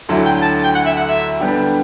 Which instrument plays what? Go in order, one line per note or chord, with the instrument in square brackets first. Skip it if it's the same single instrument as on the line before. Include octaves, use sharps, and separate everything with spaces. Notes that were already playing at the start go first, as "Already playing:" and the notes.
[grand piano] D2 D3 F#3 A3 E4 [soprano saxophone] A4
[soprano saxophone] G5
A5
G5
F#5
E5
F#5
E5
[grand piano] D3 G3 B3 D4 G4